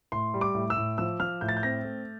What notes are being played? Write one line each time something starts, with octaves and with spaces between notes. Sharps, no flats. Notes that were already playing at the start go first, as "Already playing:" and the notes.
A2 C6
G3
D6
A2
E6
A2
F3 E6
F3 F6
A2 G6
A6
G6
C4 A#6
A3